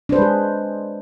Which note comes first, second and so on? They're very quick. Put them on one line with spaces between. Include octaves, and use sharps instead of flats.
D4 C5 B4 G#3 G#4